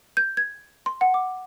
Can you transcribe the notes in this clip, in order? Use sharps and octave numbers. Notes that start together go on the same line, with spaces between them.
G6
G#6
C6
F#5
D6